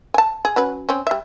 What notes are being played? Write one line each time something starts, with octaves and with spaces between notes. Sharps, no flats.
G#5 A5
G#4
F#3 C#4 B4
C4 C#4
G3 E5